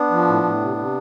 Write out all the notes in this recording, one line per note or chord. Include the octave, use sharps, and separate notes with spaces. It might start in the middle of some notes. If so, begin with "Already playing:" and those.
Already playing: B3 D4
F3
A2
A2
C3
C3